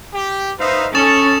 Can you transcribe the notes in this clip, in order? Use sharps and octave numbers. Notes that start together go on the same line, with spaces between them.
G4
D#4 B4 C5 E5 F5
C#4 A4 C#5 C#6 D#6 A6 E7